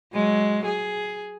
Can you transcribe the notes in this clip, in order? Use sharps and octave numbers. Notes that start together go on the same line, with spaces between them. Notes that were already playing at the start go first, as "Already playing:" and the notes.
F#3 G#3
G#4